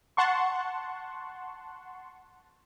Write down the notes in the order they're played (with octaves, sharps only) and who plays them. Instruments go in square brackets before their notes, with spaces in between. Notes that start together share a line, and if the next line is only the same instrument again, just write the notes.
[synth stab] F#5 A5 C6 C#6